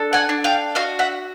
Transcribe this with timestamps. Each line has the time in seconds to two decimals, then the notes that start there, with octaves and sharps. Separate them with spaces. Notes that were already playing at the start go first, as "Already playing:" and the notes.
Already playing: D4 A4
0.13 F#5 G#5
0.29 D4
0.44 F5 G5
0.75 F#4 D#5 F5
0.99 E5 F#5